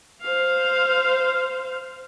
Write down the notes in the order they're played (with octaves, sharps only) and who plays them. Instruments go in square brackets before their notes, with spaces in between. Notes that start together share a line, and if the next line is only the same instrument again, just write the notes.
[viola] C5 F5